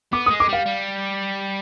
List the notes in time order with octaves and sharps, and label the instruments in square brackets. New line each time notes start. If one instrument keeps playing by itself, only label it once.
[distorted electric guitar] B3 [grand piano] D6
[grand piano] D#6
[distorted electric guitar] G#3
[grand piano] D6
[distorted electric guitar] G3 [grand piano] F5
[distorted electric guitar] G3